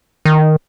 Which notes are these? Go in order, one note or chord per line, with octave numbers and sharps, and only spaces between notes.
D#3